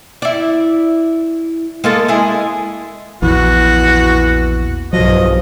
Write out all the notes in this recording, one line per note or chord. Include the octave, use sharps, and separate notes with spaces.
E4 D5
G#3 A#3 A4
G#3 E4 G#4
A#1 E2 E3 F#4
B1 G2 F3 F#3 D#5